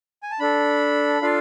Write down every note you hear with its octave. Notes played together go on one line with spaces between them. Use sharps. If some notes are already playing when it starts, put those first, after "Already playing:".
G#5
A5
D4 A4 B5
D4 F4 A4 F5